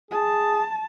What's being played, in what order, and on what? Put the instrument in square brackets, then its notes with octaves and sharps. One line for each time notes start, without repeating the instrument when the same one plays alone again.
[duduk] G#4 [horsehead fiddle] A5